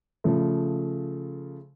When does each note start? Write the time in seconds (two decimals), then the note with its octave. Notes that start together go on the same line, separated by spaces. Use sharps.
0.24 C#3 F3 A3